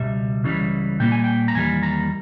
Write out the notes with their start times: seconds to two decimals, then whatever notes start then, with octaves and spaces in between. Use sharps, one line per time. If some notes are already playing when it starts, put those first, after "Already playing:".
Already playing: C#2 B2 G3 E5
0.44 C#2 C#3 E3 G3
1.00 A#2 G3 A#3 G5
1.12 G#5
1.24 G5
1.48 A#5
1.55 E2 D#3 G3 A#3 G#5
1.83 A#5